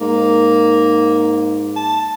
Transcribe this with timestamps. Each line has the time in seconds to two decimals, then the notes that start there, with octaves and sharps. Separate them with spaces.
0.01 G#2 A#3
1.76 A5